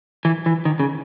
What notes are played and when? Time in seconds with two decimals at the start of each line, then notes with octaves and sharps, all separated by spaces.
0.25 E3
0.46 E3
0.65 D#3
0.80 C#3